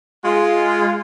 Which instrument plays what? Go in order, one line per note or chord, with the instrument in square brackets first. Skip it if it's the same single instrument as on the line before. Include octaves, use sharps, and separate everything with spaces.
[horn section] G#3 F4